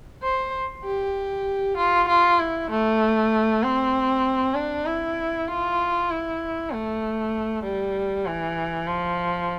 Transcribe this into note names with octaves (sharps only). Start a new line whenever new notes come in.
C5
G4
F4
F4
E4
A3
C4
D4
E4
F4
E4
A3
G3
E3
F3